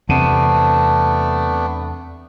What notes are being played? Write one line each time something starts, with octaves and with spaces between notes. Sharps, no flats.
E2 C3 A3 B3 C4 D4